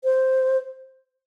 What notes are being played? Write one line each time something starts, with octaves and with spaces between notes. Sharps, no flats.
C5